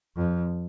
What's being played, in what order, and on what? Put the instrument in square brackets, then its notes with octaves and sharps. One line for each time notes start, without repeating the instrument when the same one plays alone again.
[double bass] F2